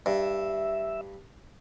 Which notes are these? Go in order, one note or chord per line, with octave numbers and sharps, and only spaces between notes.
G2 E5